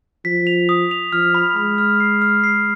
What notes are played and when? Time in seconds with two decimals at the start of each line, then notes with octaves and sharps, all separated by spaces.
0.25 F3 B6
0.47 F7
0.69 D#6
0.91 F7
1.12 F3 F6
1.35 B5
1.56 G#3 B5
1.78 F6
2.00 C7
2.22 F6
2.44 C7